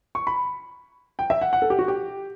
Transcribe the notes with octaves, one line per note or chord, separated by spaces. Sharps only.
C#6
B5
G5
E5
F#5
F#5
A4
G4
F#4
G4